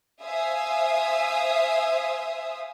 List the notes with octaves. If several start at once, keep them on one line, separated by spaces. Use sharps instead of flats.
C5 E5 F5 G#5 D#6